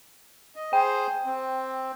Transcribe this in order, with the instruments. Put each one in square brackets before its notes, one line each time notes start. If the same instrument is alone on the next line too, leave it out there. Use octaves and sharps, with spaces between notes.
[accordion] D#5
[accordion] G#4 C5 [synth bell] G5
[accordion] C4